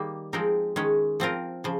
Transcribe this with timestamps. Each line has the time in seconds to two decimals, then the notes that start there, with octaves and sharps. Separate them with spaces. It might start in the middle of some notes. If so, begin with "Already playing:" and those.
Already playing: D#3 G3 A#3
0.33 F3 G#3 C4 D#4 A#4
0.76 D#3 G#3 C#4
1.20 F3 C4 F4 A#4
1.64 C#3 F3